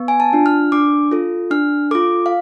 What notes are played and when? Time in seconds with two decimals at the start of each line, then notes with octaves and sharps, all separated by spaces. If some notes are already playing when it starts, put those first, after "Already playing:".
Already playing: B3
0.08 G#5
0.20 A5
0.33 D4 F4
0.46 F6
0.72 D4 D6
1.11 F4 A4
1.51 D4 F6
1.91 F4 A4 D6
2.26 F5